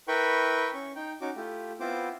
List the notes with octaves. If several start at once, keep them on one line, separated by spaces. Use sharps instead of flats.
E4 A#4 B4 G5 B5 C#6
C#4 C#6
D#4 G5
C#4 D#4 F#4 D6
A3 E4 F4 G4
B3 C4 E4 F4 C5 D6